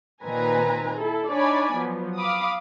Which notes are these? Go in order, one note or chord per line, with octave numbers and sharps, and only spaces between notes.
A#2 D#3 C4 B4 G#5 A#5
E4 A4
D4 D#4 C#5 D5 G#5 B5
F3 F#3 B3
F5 B5 D6 D#6